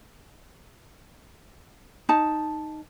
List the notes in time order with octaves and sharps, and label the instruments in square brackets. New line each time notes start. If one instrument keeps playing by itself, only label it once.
[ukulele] D#4 A5